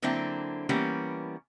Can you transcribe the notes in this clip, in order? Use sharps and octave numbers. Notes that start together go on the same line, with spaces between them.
D3 F#3 A#3 C4 D4 E4
E3 G3 A#3 B3 C#4